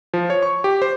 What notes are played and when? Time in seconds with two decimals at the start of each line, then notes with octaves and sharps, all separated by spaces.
0.14 F3
0.30 C#5
0.42 C#6
0.64 G4
0.82 C5